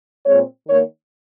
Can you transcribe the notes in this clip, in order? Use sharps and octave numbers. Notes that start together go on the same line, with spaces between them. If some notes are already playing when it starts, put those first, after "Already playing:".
A#2 G#3 C4 C#5
D#3 A#3 C#5